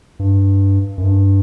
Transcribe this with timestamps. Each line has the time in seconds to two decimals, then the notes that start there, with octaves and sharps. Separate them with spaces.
0.19 G2
0.98 F#2
1.04 G2